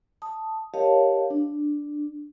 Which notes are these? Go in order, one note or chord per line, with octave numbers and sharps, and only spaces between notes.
A5 D#6
G4 A#4 C#5 D#5 F5 A5
D4